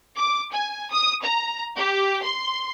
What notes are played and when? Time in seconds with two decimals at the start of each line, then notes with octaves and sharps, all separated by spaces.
0.16 D6
0.52 G#5
0.91 D#6
1.23 A#5
1.77 G4
2.23 C6